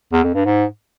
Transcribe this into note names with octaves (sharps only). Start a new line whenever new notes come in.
E2
F2
G2
G#2